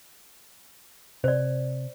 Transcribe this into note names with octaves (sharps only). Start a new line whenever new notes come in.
C3 C5 D5